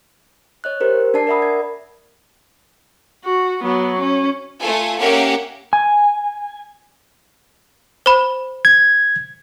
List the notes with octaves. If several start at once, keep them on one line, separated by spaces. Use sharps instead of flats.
C#5 D#5 F#6
G4 A#4 C5
D4 D5 A5 C7
A#4 D5 E5 F#5 B5 D#6
G#6
F#4
F#3 B3
C#4
A3 F4 A4 G#5
A#3 C#4 G4 A#4 E5 F#5
G#5
C5 B5
G#6